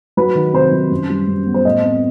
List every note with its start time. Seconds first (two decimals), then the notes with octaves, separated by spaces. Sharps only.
0.17 F#3 B4
0.35 D#3
0.53 C3 C5
0.72 F#3
0.91 F#2
1.10 G3
1.28 F#2
1.46 B3
1.54 C5
1.65 A2 D#5
1.83 C4